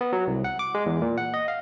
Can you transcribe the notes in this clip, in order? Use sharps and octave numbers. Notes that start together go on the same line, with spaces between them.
B3
F#3
C2
F#5
D6
G#3
E2
A#2
F#5
D#5
F5